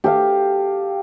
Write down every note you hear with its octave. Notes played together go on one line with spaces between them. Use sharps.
G4 A4 F5